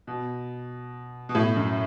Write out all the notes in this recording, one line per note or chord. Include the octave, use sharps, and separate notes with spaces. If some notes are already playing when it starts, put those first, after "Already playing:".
B2
B2
A2
F#2